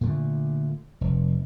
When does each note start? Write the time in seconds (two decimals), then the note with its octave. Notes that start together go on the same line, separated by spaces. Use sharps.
0.01 A#2 D3 A3
1.01 F1